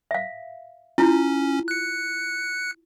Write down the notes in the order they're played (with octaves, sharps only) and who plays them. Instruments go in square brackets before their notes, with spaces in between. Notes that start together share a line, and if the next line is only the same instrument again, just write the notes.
[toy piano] E5 F5
[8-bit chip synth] C#4 [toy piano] E4 F4
[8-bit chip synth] F#6 C#7